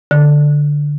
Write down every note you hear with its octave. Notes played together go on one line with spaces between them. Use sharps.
D3